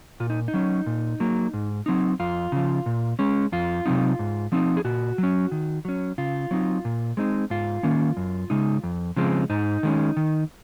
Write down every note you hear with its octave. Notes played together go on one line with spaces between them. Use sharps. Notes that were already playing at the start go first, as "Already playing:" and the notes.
A#2 F4
D#4
D#4
F#3 C#4
A#2
F#3 A#3
G#2
F#3 C4 D#4
F2 F4
C#3 F3
A#2
G#3 C#4
F2 F4
C3 F#3 C4 D#4
G#2
F3 C4 D#4
G#4
A#2 F#4
F#3 C#4
D#3
F#3 C#4
C#3 F4
F#3 C4 D#4
A#2
G#3 C4 D#4
G#2 F4
D#3 A#3 C#4
F#2
C#3 G#3 D#4
F2
C#3 F3 G#3 C4
G#2 D#4
D#3 G#3 C#4
D#3